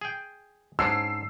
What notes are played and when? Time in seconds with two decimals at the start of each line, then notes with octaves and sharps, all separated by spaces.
0.01 G#4 G5
0.79 G#2 C#4 D4 E6 C7